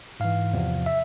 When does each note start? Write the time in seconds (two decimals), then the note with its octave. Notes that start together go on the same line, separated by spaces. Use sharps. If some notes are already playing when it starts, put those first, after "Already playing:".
0.20 G#2 E3 F5
0.54 E2 C3 F3
0.86 E5